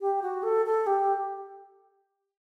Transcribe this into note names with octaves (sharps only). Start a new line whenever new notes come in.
G4
F#4
A4
A4
G4